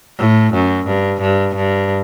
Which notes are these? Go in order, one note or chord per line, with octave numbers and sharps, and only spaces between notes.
A2
F#2
G2
G2
G2